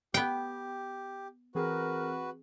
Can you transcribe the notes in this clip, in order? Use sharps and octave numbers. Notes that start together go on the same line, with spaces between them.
B3 G4 G5
E3 C4 F#4 G#4 A#4 B4